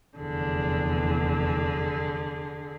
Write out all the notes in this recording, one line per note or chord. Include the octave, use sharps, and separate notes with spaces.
F1 E2 D3 G#4